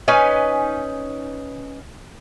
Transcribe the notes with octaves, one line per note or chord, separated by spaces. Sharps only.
C#4 D#4 B4 G#5